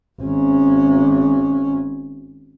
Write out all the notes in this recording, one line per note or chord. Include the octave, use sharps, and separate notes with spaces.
G#1 C#4